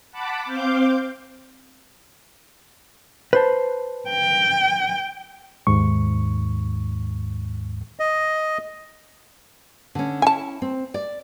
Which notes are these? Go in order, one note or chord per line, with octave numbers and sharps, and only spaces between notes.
F#5 A5 B5 D6
C4 C5 F5 D6 G6
B4 C5 A5
G5
D#2 G#2 C#6
D#5
D3 C#4
C#4 E4 G#5 A5
C4
D5